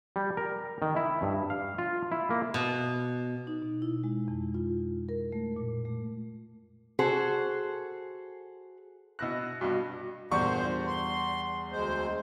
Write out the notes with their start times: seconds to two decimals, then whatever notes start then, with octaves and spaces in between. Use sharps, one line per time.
0.16 G3
0.37 A#4
0.82 D#3
0.96 E4
1.22 G2
1.50 F5
1.78 F4
2.12 E4
2.30 A#3
2.54 B2
3.47 D#4
3.62 B2
3.82 E4
4.04 G#3
4.28 F2
4.54 F4
5.09 A#4
5.32 A3
5.56 A#2
5.85 A3
6.99 F#4 G#4 A4 C5
9.19 B2 E4 F#6 A#6
9.61 G2 B2 F#4
10.31 E2 G2 A#2 G3 C5 C#6
10.87 C6
11.72 D2 G#3 C5